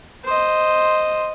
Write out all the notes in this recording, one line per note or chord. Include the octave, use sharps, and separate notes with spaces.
C5 D#5